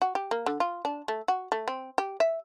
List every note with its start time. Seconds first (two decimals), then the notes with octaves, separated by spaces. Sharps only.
0.02 F#4
0.15 G4
0.31 A#3
0.46 D3
0.60 F4
0.85 D4
1.08 A3
1.28 F#4
1.52 A3
1.68 C4
1.98 G4
2.20 E5